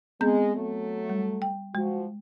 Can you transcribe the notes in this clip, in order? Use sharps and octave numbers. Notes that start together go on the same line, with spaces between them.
G#3 B3 C4 G6
F#3 A3
G3
G5
F3 G#3 F#4